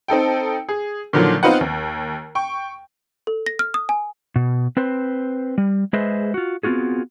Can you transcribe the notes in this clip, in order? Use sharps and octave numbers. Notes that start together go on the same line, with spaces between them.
C4 D#4 A4 G5
G#4
A#2 D3 D#3 F3 F#3
B3 C4 D#4 F4 B4 F#5
D#2
G5 C#6
A4
A#6
F6
D#6
G#5
B2
C4 B4 C5
G3
G#3 G#4 B4 C5 D#5 E5
F4 F#4
B3 C4 F4 F#4 G#4